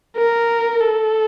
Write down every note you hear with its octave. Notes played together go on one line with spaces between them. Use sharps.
A#4
A4